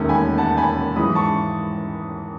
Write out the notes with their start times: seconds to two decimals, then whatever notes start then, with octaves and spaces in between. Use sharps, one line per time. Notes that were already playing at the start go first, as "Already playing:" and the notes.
Already playing: E1 D#2 D#3 A3 C#4
0.09 G#5 B5
0.38 F#5 A5
0.57 G#5 B5
0.96 G#2 E3 G#3 B5 D#6
1.15 A5 C#6